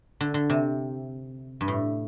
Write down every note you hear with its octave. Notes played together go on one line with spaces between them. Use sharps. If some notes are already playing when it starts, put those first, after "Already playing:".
D3
D3
C3
G2
A2